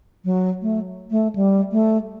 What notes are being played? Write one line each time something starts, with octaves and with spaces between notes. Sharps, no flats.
F#3
A3
A3
G3
A3